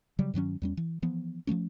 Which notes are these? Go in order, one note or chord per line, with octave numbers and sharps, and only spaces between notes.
C#3 F#3 G3
G2 D#3 F#3 C#4
E2 G3 C#4
E3
E3 F3 B3
F3 F#3 A3 C#4